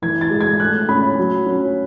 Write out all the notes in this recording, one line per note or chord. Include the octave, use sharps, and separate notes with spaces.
E3 G#6
A6
G#3
G#6
A3 F#6
C#4 B5
F#3
C#4